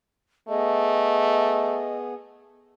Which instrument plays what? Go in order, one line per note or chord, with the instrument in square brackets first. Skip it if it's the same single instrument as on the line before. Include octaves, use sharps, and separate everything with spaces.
[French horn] A3 [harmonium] B3 G#4 [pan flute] D#5